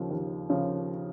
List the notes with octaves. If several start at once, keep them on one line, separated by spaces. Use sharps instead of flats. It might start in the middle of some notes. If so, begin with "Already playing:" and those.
Already playing: D#2 C#3 F3
D#2
C#3 F3